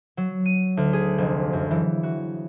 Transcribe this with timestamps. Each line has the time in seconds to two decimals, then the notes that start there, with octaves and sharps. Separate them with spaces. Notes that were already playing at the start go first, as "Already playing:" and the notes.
0.17 F#3
0.46 D#7
0.77 D2
0.93 G#4
1.18 F1
1.53 F#2
1.71 E3
2.03 F#4